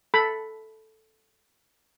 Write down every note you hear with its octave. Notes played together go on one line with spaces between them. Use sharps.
A4 B5